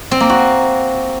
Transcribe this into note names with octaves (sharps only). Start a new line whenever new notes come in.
C4
A#3
F#4